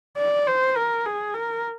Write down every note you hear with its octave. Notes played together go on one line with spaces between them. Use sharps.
D5
C5
A#4
G#4
A#4